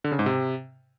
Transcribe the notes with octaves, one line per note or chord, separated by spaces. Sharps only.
D3
C#3
G#2
C3